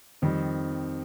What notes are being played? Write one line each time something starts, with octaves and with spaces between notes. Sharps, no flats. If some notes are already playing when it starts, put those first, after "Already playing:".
F2 D#3 G3